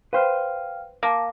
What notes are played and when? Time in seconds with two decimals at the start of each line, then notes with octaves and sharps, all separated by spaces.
0.13 B4 C5 F5 G5 F6
1.03 A#3 A5 D6